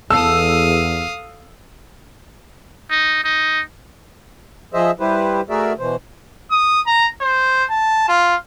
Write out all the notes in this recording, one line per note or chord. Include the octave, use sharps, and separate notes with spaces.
E2 A4 F5 D#6 E6
D#4
D#4
F3 G#4 C5 D#5 E5
G3 E4 G4 B4 C5
A3 F#4 G#4 A#4 D5 E5
B2 E3 C5
D#6
A#5
C5
A5
F4